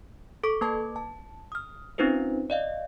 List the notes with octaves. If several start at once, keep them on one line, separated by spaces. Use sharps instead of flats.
A4 C#6 D6
A#3 B4 A5 D6 G#6
A5
D#6 F6
C4 C#4 D#4 F4 B4 C5
D5 D#5 F5